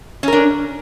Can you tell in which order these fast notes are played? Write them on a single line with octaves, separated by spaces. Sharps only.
C#4 A#4 D4